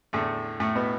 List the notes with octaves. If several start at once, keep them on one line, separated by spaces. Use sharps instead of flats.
E2 A2 D3 A3
A2 A3
B2 B3